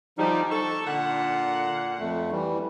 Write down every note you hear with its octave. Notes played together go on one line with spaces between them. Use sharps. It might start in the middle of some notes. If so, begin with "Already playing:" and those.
D3 F3 G3 D#4
A4 C#6
A#2 D3 F#5
F2 A3
E3 G3